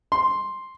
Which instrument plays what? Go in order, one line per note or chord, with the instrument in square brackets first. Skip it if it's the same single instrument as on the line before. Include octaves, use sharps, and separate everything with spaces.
[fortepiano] C6